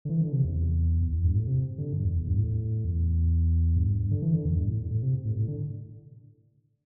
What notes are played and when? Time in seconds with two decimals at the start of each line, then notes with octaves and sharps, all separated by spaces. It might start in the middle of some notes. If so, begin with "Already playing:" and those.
0.05 D3
0.09 E3
0.22 D3
0.32 C3
0.44 E2
1.02 E2
1.12 E2
1.24 G2
1.36 A2
1.47 C3
1.78 D3
1.93 G2
2.04 E2
2.16 E2
2.27 G2
2.38 A2
2.85 E2
3.76 G2
3.88 G2
4.00 G2
4.11 D3
4.22 E3
4.34 D3
4.45 E2
4.56 G2
4.68 A2
4.91 A2
5.02 C3
5.25 A2
5.37 A2
5.48 D3